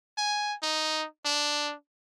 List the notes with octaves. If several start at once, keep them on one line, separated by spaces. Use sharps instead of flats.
G#5
D#4
D4